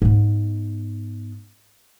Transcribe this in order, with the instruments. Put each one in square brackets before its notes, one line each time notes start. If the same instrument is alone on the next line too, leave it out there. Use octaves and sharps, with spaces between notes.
[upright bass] G#2 B3